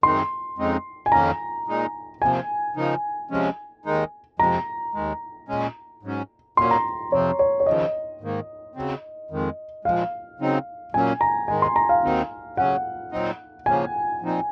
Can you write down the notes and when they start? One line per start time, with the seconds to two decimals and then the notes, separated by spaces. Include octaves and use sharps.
0.03 F#2 D#3 G#3 C4 D#4 C6
0.58 F2 C#3 G#3 C4 D#4
1.06 G#5
1.12 F2 D#3 A#3 C#4 A#5
1.67 A#2 G#3 D#4
2.21 C3 F3 A#3 G#5
2.76 C#3 F3 A#3 D#4
3.30 C3 F3 G#3 C#4
3.85 D#2 D#3 G#3 D#4
4.39 F2 C3 F3 G#3 C4 A#5
4.94 D#2 D#3 G#3
5.48 A#2 G#3 C#4
6.03 G#2 F#3 C#4
6.57 A#2 F#3 A#3 C#4 C6
6.71 A#5
7.12 F2 C3 F3 C4 C#5
7.39 C#5
7.60 C#5
7.66 D#2 C#3 F3 D#5
8.21 G#2 D#3 A#3
8.75 C#3 F#3 C4
9.31 F2 D#3 G#3
9.85 A#2 F3 G#3 F5
10.39 C#3 F#3 C4 D#4
10.94 A#2 F#3 A#3 C#4 G#5
11.21 A#5
11.48 G#2 D#3 G#3 G#5
11.62 C6
11.76 A#5
11.89 F5
12.03 D#2 D#3 F#3 C4 D#4
12.57 C#3 F#3 C#4 F#5
13.12 A#2 F#3 C4 D#4
13.66 C#3 F3 A#3 C#4 G#5
14.21 A#2 F3 C4 D#4